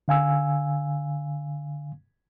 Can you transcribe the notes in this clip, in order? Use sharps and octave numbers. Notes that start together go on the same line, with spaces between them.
D3 F5 G#5 E6